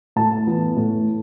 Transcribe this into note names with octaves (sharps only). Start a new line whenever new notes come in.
A2 A5
E3 B3
A2